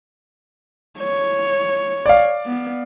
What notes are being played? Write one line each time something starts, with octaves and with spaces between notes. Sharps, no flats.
C#5
D5 F5
B3